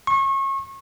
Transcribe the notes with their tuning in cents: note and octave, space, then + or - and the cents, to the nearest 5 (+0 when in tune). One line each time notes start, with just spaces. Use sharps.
C#6 -30